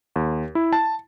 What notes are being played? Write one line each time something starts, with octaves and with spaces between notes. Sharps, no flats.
D#2
E4
A5